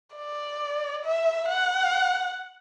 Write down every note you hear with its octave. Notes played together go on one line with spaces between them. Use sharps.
D5
E5
F#5